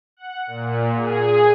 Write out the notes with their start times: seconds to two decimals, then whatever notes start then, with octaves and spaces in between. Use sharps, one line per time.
0.17 F#5
0.47 A#2
0.96 G#4